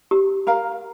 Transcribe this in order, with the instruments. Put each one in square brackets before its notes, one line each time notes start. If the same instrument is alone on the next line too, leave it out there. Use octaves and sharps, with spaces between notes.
[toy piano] G4
[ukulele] A#4 F5 A#5